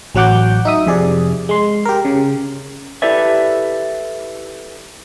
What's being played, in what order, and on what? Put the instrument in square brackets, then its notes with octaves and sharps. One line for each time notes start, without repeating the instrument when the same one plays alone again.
[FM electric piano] A1 F#3 F#4 F#5 D6 G6
D#4 E5 D#6
F2 C3 G#4 D5
G#3 C6
G4 A#4
C#3
[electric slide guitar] E4 G4 A4 B4 D5 E5